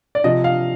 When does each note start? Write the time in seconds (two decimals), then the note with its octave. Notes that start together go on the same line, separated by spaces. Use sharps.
0.15 D5
0.24 C3 F3 D#5
0.44 F5